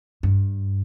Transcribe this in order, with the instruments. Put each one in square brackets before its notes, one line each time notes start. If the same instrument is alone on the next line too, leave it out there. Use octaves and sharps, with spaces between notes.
[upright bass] G2